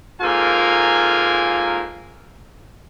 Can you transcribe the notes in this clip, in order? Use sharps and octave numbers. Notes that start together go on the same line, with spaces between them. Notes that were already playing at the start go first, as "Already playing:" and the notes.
G#2 A#3 F4 A4 A#4 G#5